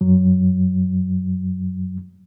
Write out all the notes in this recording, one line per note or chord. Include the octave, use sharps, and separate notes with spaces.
F#2 F#3